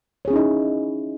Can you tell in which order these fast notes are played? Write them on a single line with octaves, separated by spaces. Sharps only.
C#5 G#4 C#4 E4 D#4